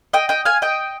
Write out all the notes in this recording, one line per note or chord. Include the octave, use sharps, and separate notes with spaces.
D#5 G5
D#5 G5
F5 G#5
D#5 G5